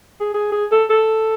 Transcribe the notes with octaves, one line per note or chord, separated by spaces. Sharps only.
G#4
G#4
G#4
A4
A4